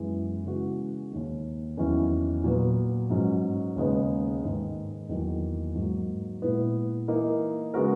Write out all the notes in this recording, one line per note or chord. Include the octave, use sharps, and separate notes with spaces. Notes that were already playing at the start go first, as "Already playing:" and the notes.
Already playing: F#2 E3 G#3 B3
C#3 E3 G#3 B3 F#4
D#2 D#3 A#3
E2 D#3 F#3 C#4 E4
A#2 F#3 B3
G#2 F#3 C#4
D#2 C#3 G#3 B3 D#4
G#2 D#3 G#3
E2 D#3 F#3 A#3
G#2 F#3 A#3
A#2 G#3 B3 E4
E3 A#3 D#4 A#4
C#3 G#3 B3 F#4 A#4